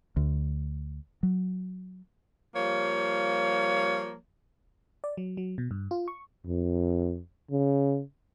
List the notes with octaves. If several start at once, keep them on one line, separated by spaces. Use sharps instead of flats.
D2
F#3
F3 G3 A#3 C#5
D5
F#3
F#3
B2
G2
F4
C#6
F2
C#3